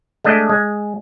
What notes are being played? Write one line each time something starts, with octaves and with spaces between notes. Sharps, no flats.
G#3 A3 D4 D#5
G#3